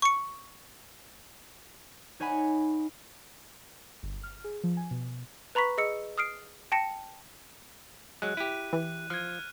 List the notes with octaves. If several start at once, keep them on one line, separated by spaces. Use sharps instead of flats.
C#6 C#7
D#4 C#5 F#5 G#5 B5
G1
F6
G#4
F3
G#5
B2
B4 A#5 B5 C#6 B6
G#4 D#5 E6 C#7
D#6 F6 C7 D7
G5 A5 A#6 C#7
F#3 G#3 F#6
E4 G4 D#7
E3
F3 F6 G#6